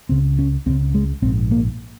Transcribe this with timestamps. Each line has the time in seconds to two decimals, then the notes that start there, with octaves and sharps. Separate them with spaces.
0.09 C#2 C#3 C4
0.39 C#4
0.66 C#2 C#3 C4
0.94 G#3
1.22 A#1 G#2 C4
1.51 A#3